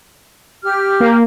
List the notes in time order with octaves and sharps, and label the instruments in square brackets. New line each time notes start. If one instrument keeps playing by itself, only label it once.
[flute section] G4 F6
[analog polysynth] A#3